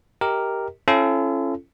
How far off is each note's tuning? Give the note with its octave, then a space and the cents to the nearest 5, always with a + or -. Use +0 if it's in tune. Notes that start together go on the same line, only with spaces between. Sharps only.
G4 +0 A#4 +0 D#5 +35
C#4 -25 F4 -45 A4 -10